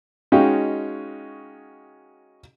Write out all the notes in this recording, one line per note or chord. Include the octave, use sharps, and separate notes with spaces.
G#3 C#4 D#4 F#4 F5 G5